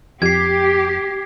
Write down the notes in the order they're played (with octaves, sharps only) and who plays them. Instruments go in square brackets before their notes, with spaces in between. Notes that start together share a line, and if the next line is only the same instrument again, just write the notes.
[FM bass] F2 [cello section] G4 [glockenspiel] G#6 C7